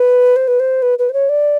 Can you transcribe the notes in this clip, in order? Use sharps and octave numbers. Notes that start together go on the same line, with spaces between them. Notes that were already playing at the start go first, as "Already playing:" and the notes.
Already playing: B4
C5
B4
C5
B4
B4
C5
C#5
D5